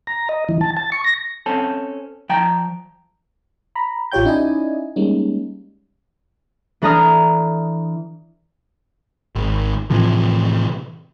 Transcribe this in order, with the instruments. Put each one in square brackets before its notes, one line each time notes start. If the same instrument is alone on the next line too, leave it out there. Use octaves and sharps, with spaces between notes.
[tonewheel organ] A#5
D#5
E3
A5
A5
C#6
A#6
[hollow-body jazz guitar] C4 C#4 A4
F3 G5 A#5
[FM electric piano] A#5 B5
A1 F4 G4 C#5 G5 G6
C#4 D#4 E4 D5 D#5 G#5
G3 G#3 A#3 C#4 D#4
[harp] E3 D4 A4 A#5 D#6 F6
[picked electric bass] G#1
A2 C3 E3 F3